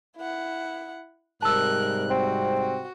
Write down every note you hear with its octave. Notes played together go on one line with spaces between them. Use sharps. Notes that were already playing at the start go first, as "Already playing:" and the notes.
E4 F#5
G#2 C3 G3 A#4 A5 E6 F#6
C4 F#4
F#4